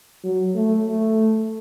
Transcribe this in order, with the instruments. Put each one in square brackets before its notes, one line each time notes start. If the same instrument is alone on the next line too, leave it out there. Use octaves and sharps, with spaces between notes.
[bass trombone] F#3
A3
A3